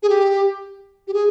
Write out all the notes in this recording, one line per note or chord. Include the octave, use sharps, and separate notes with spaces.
G#4
G4
G4
G#4